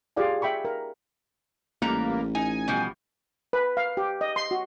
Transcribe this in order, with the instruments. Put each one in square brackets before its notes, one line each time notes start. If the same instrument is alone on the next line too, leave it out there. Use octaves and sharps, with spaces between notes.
[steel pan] F4 G4 G#4 D5 F5 G#5
E5 G5 B5 C#6
A#4
[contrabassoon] A1 [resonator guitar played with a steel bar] G#2 G3 A#5 [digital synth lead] A#3
[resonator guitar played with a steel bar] D#4 [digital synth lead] G#5
[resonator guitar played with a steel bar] B2 F3 G3
[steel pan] B4
F5
G4
D#5
C6
F#4